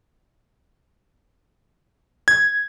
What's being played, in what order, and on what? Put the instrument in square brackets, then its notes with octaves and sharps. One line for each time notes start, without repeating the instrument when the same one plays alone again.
[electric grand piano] G#6